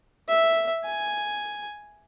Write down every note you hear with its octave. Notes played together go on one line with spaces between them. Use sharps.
E5
G#5